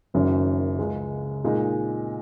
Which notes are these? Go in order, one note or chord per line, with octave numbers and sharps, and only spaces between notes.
F#1 F#2 D#3 F#3 C#4
C#2 C#3 G#3
A#2 G#3 D#4